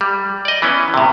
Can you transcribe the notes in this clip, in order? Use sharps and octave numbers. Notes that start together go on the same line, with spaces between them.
G3
D5 D#5
E3 B3 C#4
A2 C3